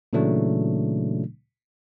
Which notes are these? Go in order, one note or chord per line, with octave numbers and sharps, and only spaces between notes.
A#2 C#3 E3 F#3 A3 D4